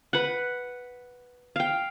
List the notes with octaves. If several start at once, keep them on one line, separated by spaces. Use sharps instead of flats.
B4 F#5
F5 G5